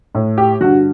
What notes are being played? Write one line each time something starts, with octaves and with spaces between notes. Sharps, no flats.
A2
G4
G2 D3 F#4